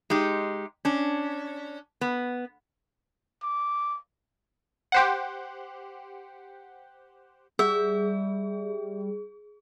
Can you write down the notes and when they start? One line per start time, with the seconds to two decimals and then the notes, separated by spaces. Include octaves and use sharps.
0.10 G#3 D#4 G4
0.85 C#4 D4
2.01 B3
3.43 D6
4.92 G4 C5 F#5
7.59 G3 G#4 E5